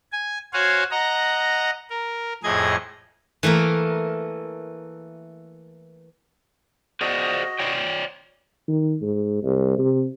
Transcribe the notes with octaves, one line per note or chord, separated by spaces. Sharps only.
G#5
F#4 C5 C#5 F5 F#5 G#5
D#5 F#5 A#5
A#4
F2 A2 G#4 D#5 G#6
E3 A3 A#3 A#4
F#4 G#4 C5 D5 D#5
C#5 D5 G5
D#3
G#2
C2
C3